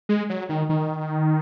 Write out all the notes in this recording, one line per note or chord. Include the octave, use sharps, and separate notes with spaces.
G#3
F#3
D#3
D#3